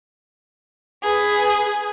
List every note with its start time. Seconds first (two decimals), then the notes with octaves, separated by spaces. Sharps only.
1.03 G#4 B4